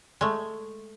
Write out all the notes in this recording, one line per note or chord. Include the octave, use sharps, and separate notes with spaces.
G#3 A3